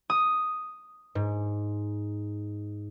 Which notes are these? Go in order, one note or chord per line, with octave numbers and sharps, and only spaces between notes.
D#6
G#2